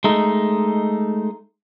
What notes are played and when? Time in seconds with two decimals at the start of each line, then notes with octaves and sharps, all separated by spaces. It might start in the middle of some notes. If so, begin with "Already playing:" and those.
0.04 G#3 A3 D#4